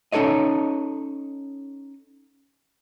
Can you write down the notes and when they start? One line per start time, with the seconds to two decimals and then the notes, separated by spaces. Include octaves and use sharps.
0.12 C#4 D#4 A4 C#5 D#5